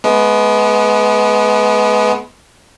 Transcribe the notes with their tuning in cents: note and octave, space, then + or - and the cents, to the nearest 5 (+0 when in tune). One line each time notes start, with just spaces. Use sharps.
G#3 +35 B3 +0